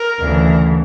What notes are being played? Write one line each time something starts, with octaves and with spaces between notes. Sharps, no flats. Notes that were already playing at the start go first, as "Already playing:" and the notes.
Already playing: A#4
D2 C#3 E3